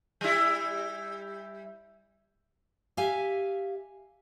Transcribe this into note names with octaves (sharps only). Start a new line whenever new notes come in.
G3 E4
G4 E5 F5 G#5